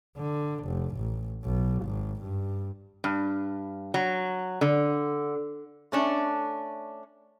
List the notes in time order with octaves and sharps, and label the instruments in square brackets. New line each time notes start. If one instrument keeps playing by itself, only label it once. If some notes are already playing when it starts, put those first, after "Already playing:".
[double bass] D3
F1
A1
B1
G#1
G2
[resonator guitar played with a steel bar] G2
F#3
D3
A3 C#4 D4